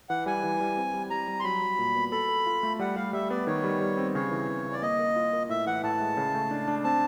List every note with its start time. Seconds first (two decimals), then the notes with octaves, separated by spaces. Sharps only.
0.09 E3 F#5
0.26 G3 G#5
0.44 E3
0.60 G3
0.77 C4
0.94 G3
1.10 G3 A#5
1.28 G3
1.40 C6
1.44 F#3 B5
1.62 F#3
1.79 A#2
1.95 B3
2.12 A4 B5
2.29 A4
2.46 F4
2.63 A3
2.79 G3 F#5
2.96 G3 F5
3.13 G3 E5
3.30 B3 D5
3.47 D#3 C#5
3.64 G3
3.81 G3
3.98 C4
4.14 C#3 C#5
4.31 E3
4.48 C#3
4.65 C#3
4.72 D5
4.82 A#3 D#5
4.99 A#4
5.16 F4
5.33 A#4
5.49 A2 E5
5.66 E3 F#5
5.83 A2 A5
6.00 G#3
6.17 C#3
6.34 A3
6.51 D4
6.68 D4
6.84 C4 A5